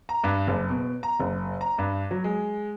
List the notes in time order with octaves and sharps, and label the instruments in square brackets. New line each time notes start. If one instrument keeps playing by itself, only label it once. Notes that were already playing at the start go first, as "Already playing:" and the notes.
[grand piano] A#5
G2
F#1
B2
A#5
F#1
A#5
G2
F#3
G#3